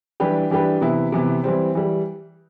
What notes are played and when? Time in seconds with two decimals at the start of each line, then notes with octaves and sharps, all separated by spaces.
0.20 E3 G3 D4 G4 B4
0.51 E3 G3 D4 G4 B4
0.81 C3 E3 B3 E4
1.12 C3 E3 B3 E4
1.44 E3 G3 C4
1.75 E3 G3